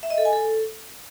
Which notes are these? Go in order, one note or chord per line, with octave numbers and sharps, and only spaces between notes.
E5
D#5
A4
G#5
A4